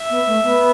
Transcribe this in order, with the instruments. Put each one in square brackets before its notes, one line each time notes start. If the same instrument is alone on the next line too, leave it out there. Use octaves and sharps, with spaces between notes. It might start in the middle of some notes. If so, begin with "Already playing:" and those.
Already playing: [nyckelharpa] E5
[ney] B3
A3
B3